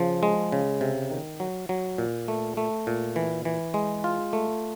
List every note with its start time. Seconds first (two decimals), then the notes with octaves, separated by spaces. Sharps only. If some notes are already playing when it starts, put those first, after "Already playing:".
Already playing: C#3 F3
0.23 G#3
0.52 C#3
0.81 C3
1.11 D#3
1.40 F#3
1.69 F#3
1.98 A#2
2.28 A3
2.57 A3
2.87 A#2
3.16 E3
3.45 E3
3.74 G#3
4.04 F4
4.33 A3